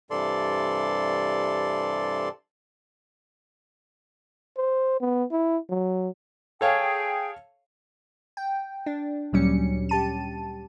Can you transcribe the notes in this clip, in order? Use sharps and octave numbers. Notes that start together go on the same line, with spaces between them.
G2 C3 E3 A4 D5 C6
C5
B3
E4
F#3
G#4 A4 C#5 F5 G5
G5
D4
D2 A#2 F#3 G3 C#4 C#7
G4 A5 D#7